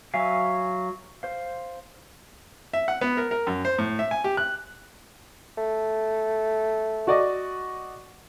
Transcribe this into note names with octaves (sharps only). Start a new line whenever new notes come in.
F#3 E5 F5 G#5
C5 F5
E5
F#5
B3
A#4
A#4
F#2
C5
A2
E5
G#5
G4
F#6
A3
F#4 D5 D#5